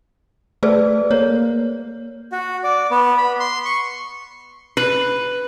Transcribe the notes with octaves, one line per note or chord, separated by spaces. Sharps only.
A3 G#4 B4 D5
A#3 C#5
F#4
D5
B3
B5
C6
C#6
B4